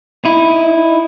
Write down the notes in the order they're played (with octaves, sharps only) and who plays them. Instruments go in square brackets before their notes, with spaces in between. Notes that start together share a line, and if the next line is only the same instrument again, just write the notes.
[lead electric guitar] D#4 E4